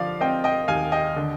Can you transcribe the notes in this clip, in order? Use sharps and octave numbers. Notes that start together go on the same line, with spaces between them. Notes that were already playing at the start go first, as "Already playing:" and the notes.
Already playing: D3 F3 D5 F5
C4 D#5 G5
D#5 G5
D#2 F5 G#5
D#5 G5
D3